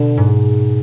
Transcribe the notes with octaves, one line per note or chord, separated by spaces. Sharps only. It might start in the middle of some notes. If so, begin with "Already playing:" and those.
Already playing: B2 D3
G#2